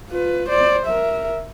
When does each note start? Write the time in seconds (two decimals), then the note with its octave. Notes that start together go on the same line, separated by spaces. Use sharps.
0.10 F4 B4
0.49 C5 D5
0.86 A#4 E5